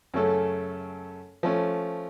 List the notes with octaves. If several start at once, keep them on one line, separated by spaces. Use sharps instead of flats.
F#2 C#3 A3 C#4 A4
F3 A3 C#4